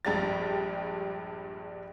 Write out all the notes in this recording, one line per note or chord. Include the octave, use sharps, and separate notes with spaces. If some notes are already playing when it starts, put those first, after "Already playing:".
A#1 G2 G3 G#3 G4 A6